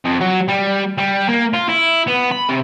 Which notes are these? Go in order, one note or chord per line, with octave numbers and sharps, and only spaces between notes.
F2
F#3
G3
G3
A#3
F4
E4
B3
B5
C3